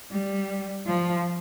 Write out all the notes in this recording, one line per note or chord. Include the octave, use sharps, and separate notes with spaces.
G3
F3